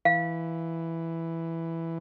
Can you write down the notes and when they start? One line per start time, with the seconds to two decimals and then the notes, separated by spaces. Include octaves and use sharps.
0.05 E3 F5